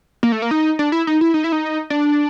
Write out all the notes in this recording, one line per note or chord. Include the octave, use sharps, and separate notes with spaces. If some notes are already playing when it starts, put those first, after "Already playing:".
A#3
A3
A#3
D#4
D4
E4
D#4
E4
D#4
E4
D#4
D4